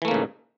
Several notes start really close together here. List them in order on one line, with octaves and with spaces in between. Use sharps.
E3 A3 A#3 C#3 G#2